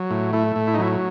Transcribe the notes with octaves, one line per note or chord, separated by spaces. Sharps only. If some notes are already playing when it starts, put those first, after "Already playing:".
Already playing: F#3
A2
A3 E4
A2
E4
D#4
F#3 E4